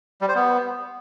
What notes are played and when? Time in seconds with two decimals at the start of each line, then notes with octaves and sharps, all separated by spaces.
0.21 G3
0.28 C5
0.35 B3